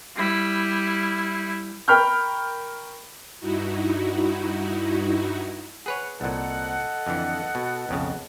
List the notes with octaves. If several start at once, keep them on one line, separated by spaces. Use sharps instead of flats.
G3 E4
A#4 G5 B5 C#6 F6 G6
G2 D#4 E4 F#4
G#4 B4 C#5 F#5
C2 A#2 A4 D#5 F#5
F2 D3 E3
B2
B1 F2 C#3